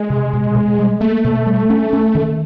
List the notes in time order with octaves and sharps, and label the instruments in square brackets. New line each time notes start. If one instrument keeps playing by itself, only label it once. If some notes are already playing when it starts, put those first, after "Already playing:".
Already playing: [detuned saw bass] G#3
[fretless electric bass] C3
B2
B2
G3
[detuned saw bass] A3 [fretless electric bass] A#3
[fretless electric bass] B2
G3
C#4
C#4
D#3